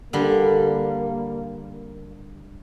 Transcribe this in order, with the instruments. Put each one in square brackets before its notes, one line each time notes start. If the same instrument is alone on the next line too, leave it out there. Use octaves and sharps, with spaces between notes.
[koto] D3 G3 [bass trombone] A#3